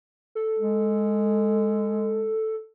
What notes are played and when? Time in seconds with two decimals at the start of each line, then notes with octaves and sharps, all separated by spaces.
0.35 A4
0.59 G#3